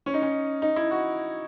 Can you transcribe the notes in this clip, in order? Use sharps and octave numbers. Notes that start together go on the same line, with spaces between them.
C#4
D#4
C#4
D#4
E4
F#4